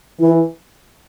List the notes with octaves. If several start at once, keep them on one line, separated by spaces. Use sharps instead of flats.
E3 E4